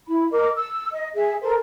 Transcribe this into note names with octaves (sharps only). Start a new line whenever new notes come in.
E4 B5
A#4 D#5 D6
E6
D#5
G#4 E5
A4 A#4 C5